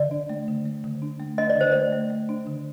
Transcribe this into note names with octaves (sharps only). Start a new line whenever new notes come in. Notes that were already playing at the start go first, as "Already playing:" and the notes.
Already playing: D3 D5
D4
A3
D3
A3
D3
D4
A3
D4 D#5
D5
D3 C5
A3 D5
A3
A3
D4
D3